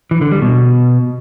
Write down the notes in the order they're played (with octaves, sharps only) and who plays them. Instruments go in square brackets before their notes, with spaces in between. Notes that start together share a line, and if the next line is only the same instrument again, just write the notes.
[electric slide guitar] E3
D3
G3
B2